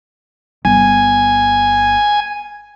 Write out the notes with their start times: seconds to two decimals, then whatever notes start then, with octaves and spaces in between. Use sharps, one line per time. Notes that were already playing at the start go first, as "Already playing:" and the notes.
0.65 G1 G#5